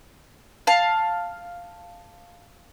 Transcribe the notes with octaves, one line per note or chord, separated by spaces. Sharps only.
F5 A5